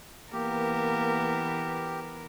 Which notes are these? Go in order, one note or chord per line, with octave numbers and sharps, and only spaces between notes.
E3 A#3 B3 G4 A#4